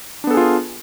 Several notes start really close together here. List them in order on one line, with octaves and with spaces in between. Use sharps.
D4 B3 A4 G#4 F4